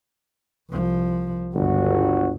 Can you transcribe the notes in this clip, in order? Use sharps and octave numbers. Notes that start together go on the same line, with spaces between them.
C2 F3
G1 C#2 G2 F#4